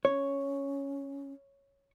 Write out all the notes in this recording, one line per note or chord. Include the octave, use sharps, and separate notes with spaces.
C#4 C#5